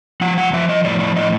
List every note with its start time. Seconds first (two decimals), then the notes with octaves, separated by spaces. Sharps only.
0.21 F3 F#5
0.37 F#5
0.53 F3 E5
0.69 D#5
0.85 A2 D5
1.00 D5
1.16 A2 D#5